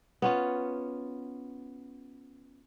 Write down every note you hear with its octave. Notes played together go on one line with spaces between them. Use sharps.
B3 C#4 F4